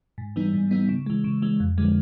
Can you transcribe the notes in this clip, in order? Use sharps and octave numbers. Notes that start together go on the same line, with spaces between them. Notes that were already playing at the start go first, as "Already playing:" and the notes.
G#2
E3 G3 B3 D#4
G#2
E3 G3 B3 D#4
C#3
E3 G#3
C#3
E3 G#3
F2
D3 F3 G#3